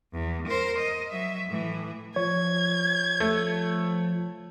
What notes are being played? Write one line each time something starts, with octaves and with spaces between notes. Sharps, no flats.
E2
A#4 C5
D#5
F#3 E5
A2 E3
F3 C#5 G#6
A3